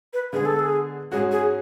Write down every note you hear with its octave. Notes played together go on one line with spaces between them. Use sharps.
B4
D3 G#3 B3 G#4
A4
G#4
G#2 G#3 C#4 F#4 G#4
G#4